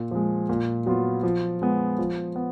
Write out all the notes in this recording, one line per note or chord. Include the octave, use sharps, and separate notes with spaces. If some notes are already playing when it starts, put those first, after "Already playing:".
Already playing: A#2
F3 G#3
A#2
F#3 B3 F4
F3
G#3 B3
F3
B3